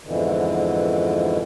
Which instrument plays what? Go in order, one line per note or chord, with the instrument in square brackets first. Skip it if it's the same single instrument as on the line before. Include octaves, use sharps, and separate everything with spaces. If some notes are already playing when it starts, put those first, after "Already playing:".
[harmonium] F2 G#2 B2 D3 E3